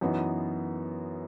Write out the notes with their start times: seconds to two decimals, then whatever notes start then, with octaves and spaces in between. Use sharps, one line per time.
0.01 F#2 E3 B3 D#4